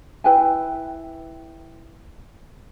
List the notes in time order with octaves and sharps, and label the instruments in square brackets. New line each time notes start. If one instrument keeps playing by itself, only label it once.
[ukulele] E4 B4 G5 G#5